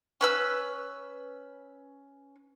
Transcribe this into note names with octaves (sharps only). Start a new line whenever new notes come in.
C#4 B4 E6